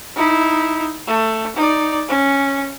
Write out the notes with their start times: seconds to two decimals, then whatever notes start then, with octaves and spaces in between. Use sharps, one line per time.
0.16 D#4 E4
1.07 A3
1.56 D#4 D5
2.09 C#4